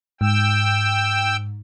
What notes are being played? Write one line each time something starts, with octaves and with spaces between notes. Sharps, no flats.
G#2 G5 E6